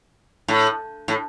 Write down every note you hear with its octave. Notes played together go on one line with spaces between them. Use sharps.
A2
A2